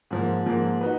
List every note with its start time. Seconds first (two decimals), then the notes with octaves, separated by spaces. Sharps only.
0.11 G#2 F3 A#3
0.46 G#2 F3 A#3
0.81 D#4 F#4 B4